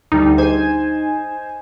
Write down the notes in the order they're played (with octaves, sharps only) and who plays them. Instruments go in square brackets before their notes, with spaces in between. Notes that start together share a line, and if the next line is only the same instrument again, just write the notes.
[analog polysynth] D2 G3 [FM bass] D#4
[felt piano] G#4 C5 D#5 [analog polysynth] G#5